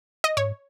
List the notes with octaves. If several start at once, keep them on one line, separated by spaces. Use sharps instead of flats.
D#5
G#2 C#5